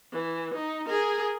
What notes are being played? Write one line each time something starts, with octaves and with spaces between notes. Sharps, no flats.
E3
D#4
G#4 A#4